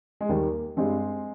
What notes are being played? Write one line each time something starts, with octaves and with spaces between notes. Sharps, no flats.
G#3
D#2 D#3 G3 A#3
G2 G3 G#3 C4